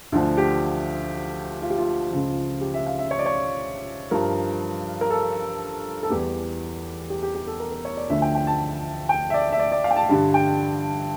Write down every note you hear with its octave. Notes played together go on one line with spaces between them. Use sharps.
D2 D3 F3
G4
F4
G4
F4
C#2 C#3 F3
G4
E5
F5
E5
C#5
D5
C#5
G2 F3 A#4
A#4
A4
A4
E2 E3 G3 G4
G4
G4
G4
A4
A#4
A#4
C#5
D5
D2 D3 F3 E5
G5
G5
A5
G5
E5
D5
E5
D5
D5
F5
G5
A5
G2 D3 G3 A5
G5